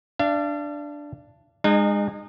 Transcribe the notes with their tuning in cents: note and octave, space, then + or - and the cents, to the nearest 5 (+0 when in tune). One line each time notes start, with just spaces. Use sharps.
D4 +0 F5 -45
G#3 -20 D#4 -40